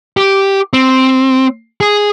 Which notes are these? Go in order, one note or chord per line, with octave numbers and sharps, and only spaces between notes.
G4
C4
G#4